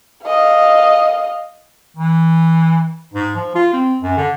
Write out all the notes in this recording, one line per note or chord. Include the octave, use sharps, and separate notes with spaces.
D#5 F5
E3
G#2
F3
F4
C4
F#2
D3